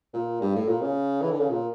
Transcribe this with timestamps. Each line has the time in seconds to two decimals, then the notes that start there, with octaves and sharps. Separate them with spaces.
0.13 A#2
0.41 G2
0.55 A2
0.68 A#2
0.81 C#3
1.21 E3
1.31 D3
1.40 C#3
1.49 A#2